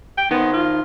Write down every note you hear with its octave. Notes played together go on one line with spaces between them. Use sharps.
G5
D#3 B3 C5
F4